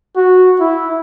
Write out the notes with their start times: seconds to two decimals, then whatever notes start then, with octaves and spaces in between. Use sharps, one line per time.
0.17 F#4
0.61 E4